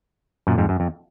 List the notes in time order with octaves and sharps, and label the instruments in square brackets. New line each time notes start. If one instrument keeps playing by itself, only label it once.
[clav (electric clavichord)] F#2 A#2
F2 G#2
F#2
F2